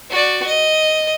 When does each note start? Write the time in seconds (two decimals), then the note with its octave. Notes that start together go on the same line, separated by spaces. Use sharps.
0.10 F#4 D5
0.46 D#5